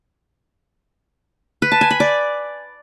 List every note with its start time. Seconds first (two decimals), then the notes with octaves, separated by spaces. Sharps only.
1.62 B4
1.72 A5
1.81 G#5
1.91 B5
2.00 D5